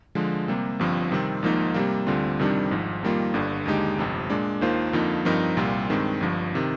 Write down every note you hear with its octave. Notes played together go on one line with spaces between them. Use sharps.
D3 F3 G#3
C3 G3 A#3
G1 G2 F3 C4
C3 D#3 G3 C4
G#1 G#2 F3 A#3 D#4
C3 G3 A#3
D2 D3 G3 C4 F4
F2 C3 D#3 G3 D4
G#1 G#2 F3
F2 D#3 G3 A#3 F4
G1 G2 D3
D#2 D3 G#3 D#4 G4
G1 F2 C3
A#2 G#3 D4
D#2 D#3 A#3 F4 C5
F2 D3 F3 A#3 D#4
G2 F3 C4 D#4 A#4
C2 A#2 G3 C4 F4
G2 D#3 G#3 C4
G1 G2 F3
C3 D#3